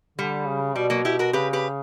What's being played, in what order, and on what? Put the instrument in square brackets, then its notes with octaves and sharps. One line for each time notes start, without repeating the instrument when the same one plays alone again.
[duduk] D3 [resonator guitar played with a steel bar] G3
[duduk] C#3
[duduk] B2 [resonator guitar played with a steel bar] G3
[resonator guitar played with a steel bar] F#3 A#3
E4 G4
F#4 A#4
[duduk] C#3 [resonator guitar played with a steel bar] G4 B4
[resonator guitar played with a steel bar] G4 B4